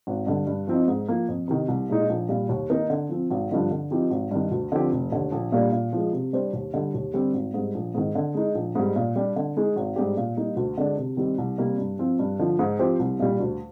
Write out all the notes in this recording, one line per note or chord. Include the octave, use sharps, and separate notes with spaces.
G#1
G2 D3
G2
F3 C4 D#4
G#2
F3 A#3
F2
C3 D#3
C2
A#2 G#3 D#4
A#1
A#2 G3
D#2
D#3 A#3 D#4 A#4
D3
F3 C4
G#1
G2 D3 F3
D3
F3 C4 D#4 G4
G#1
G2 D#3
D2
D3 F3 C4 G4
F1
D#2 D3
A#1
A#2 G3 A#3 D4
A#2
F3 G#3
C3
G3 D4 G4 C5
D#2
D3 G3
D#2
D3 G3 C4 G4
G#1
G#2 G3
A#1
G#2 D#3
D3
G#3 D#4
A#1
G#2 G3
A#2
G3 D4 G4
D3
G#3 D#4 G#4
G#1
G#2 G3 D4 G4
A#2
G3 A#3 D#4
D2
D3 G#3 D4
C3
D#3 G3 C4 G4
C2
C3 G3 A#3
G2
F3 C4 F4
G2
D3 F3
G#2
F3 C4 G4 C5
C2
A#2 G3
D2